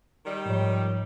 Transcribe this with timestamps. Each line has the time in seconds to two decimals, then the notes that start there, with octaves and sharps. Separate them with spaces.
0.25 D#3 G3
0.46 G#2 F3 C#5